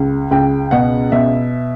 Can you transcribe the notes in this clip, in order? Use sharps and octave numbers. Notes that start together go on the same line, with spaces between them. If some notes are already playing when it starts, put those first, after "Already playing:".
Already playing: C#2
C#2 G5
B2 F#5
B2 E5